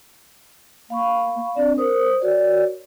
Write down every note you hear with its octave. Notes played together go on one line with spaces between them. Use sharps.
A#3 F5 B5 C#6
C4 D4 D5
A#4 C5 D#6
F#4 A#4 C#5 D5